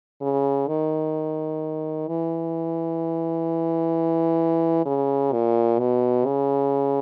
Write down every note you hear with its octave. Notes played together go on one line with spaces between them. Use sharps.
C#3
D#3
E3
C#3
A#2
B2
C#3